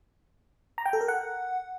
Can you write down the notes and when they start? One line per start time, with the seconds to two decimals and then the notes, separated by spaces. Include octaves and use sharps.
0.78 A#5
0.86 G5
0.93 A4
1.01 A#4
1.08 F#5